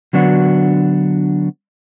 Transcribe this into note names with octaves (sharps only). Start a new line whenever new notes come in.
D3 F#3 B3 D4 F#4